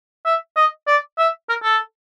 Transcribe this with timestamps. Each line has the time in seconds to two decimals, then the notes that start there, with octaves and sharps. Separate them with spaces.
0.25 E5
0.56 D#5
0.87 D5
1.18 E5
1.49 A#4
1.63 A4